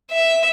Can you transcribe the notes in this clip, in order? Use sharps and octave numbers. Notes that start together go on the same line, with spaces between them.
E5